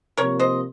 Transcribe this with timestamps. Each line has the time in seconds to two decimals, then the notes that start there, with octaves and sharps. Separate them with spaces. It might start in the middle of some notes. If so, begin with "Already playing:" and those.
0.17 C3 F3 A#3 A#4 C#5
0.39 C5 D#5